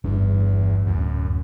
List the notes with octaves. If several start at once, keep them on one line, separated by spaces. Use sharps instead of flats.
G1 E2 D4
D1 F#2